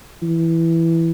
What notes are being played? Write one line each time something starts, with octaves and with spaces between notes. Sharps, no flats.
E3